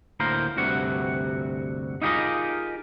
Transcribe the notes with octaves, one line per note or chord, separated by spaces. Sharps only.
D2 A2 A#3 A#4 C5
D2 G2 C3 F#4 F#5
D#4 F4 G4 G#4 A#4 D#5